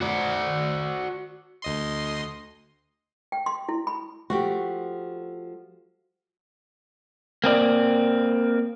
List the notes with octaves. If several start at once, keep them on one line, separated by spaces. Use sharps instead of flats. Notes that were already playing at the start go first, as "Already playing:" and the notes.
F#4 D5
D2 D#5 C6
G5
C6
E4
B5
F3 A3 F#4 G4
A#3 C4 D4 D5